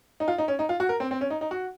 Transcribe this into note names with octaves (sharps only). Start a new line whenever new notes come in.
D#4
F4
D#4
C#4
D#4
F4
F#4
A#4
C4
C4
C#4
D#4
D#4
F#4